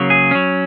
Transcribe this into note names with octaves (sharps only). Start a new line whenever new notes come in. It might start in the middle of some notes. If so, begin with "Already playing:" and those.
Already playing: C#3 F#3 A#3
G#4
F#3 C#4